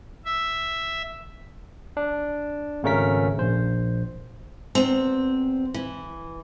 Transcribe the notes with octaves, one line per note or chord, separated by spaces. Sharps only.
E5
D4
G#1 C#3 A3 C#4 A#4 B6
A#1 C5
E2 C4
E3